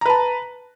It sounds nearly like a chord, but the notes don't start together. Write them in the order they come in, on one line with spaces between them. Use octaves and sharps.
A#5 B4 A5